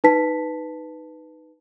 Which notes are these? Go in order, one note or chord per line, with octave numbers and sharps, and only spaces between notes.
D#4 B4 A5 B6